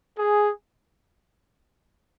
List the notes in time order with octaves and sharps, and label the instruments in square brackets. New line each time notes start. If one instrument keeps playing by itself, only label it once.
[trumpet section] G#4